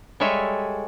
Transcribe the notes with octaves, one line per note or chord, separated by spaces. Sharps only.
G3 G#3 A4 C#5 E5